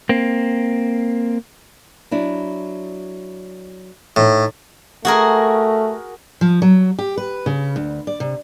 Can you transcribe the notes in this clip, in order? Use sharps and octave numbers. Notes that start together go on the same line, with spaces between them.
A#3 C4
F#3 D4 E4
A2 D#4 A4
A3 F#4 G#4 A#4
F3
F#3
G4
B4
C#3
D2
D5
C3